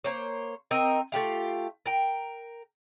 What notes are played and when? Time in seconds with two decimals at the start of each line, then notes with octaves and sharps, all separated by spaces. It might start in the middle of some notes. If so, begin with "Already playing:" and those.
0.04 A#3 C5 C#5
0.71 C4 D#4 A#4 D#5
1.12 A3 F4 G4 F5
1.86 A#4 G5